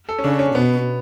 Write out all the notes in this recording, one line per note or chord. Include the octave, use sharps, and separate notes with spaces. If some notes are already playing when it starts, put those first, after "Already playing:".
A4
C#4
C#3 D4
C#4
B2 B3